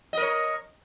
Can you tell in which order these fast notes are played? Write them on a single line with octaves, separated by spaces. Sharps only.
D#5 A#4 C#5